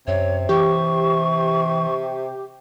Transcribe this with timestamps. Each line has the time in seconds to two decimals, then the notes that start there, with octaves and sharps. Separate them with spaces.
0.07 F#2 C3 C#5
0.49 E3 G4 C#6